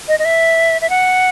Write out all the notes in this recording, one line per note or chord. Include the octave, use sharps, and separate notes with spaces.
D#5
D#5
E5
E5
F#5